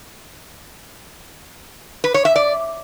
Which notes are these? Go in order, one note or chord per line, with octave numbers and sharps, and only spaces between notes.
B4
C#5
E5
D5